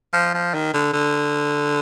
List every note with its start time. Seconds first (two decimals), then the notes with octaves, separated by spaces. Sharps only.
0.13 F3
0.34 F3
0.54 D#3
0.73 D3
0.93 D3